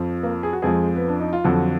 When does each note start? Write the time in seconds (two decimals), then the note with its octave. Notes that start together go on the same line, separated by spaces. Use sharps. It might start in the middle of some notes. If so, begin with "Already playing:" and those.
Already playing: F2 F3
0.23 A#3 A#4
0.43 G#4
0.53 F#4
0.62 F2 F3 G#3 G#4
0.96 B3
1.08 D4
1.20 D#4
1.33 F4
1.44 F2 D3 F3 F#3 F#4